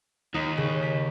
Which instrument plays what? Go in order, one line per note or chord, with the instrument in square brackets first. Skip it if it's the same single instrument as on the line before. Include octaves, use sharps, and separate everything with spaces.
[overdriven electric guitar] D#2 [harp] D#4
[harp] C#3
B6